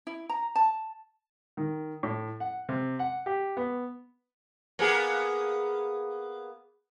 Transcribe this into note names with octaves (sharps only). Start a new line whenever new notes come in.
E4
A#5
A5
D#3
A2
F#5
C3
F#5
G4
B3
A#3 B3 G#4